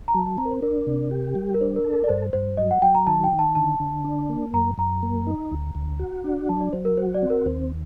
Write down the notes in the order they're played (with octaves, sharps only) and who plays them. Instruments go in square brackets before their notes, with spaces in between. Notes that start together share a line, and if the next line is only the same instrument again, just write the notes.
[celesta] A#5
[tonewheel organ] F#3 [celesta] A5
[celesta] A5
[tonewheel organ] C4 [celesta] A#5
[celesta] A#4
C5
[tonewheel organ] D4 [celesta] A#4
[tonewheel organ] C3
G4
G3
[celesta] A#4
[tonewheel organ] D4 [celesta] C5
[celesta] A#4
[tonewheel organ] A4
[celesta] A#4
D5
[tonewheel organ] G2 [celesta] C5
[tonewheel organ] G2 [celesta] C5
[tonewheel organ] F#3 [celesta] D#5
[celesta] F#5
[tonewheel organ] F#3 [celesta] G5
[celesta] A#5
[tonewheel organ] D#3 [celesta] A5
[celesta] G5
[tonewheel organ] D#3
[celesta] A5
[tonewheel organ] D3 [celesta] A5
[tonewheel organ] D3
D4
A#3
[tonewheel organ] F#2 [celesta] A#5
[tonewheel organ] F#2 [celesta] A#5
[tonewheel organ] A#3
D#4
D2
D2
F#4
D4
[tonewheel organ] F#3 [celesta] A5
[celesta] D5
[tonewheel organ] F#3 [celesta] C5
[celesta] A#4
[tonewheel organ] F#4 [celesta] C5
[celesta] D5
[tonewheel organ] C4
[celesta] A#4
[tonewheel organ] D#2 [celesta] C5